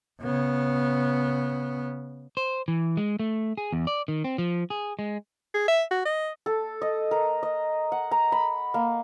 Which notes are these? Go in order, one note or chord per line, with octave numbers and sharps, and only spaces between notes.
C#3 B3
C5
E3
G#3
A3
G#4
E2
D5
D#3
C4
F3
G#4
G#3
G#4
E5
F#4
D#5
A4
D#5
A#4
D#5
F#5
A#5
B5
A#3